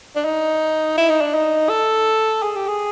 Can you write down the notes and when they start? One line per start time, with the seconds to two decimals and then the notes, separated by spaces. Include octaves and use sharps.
0.16 D4
0.25 D#4
0.98 E4
1.09 D#4
1.21 D4
1.34 D#4
1.69 A4
2.42 G#4
2.55 G4
2.68 G#4